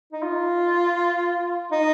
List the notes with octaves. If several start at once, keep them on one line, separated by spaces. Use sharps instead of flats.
D#4
F4
D#4